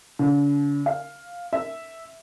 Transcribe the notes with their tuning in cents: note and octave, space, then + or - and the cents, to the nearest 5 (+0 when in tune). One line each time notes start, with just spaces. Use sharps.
D3 -45
F5 +5
E5 -5